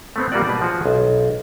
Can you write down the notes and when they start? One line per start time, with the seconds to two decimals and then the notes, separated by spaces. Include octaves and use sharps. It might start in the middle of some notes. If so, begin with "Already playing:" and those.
0.16 A3 B3 C4
0.32 G3 A#3 F4 F#4 D5
0.47 B2 B4
0.62 F3 F#4 G#4
0.86 B1